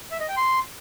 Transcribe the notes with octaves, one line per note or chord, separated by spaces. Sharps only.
E5
D#5
G5
C6